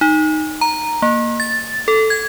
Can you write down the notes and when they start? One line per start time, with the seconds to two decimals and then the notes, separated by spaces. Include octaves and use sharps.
0.01 D#4
0.61 A#5
1.02 A#3
1.40 A6
1.88 A4
2.10 G#6